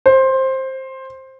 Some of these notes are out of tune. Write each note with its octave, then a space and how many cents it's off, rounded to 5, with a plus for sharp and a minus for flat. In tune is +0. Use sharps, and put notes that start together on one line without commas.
C5 +15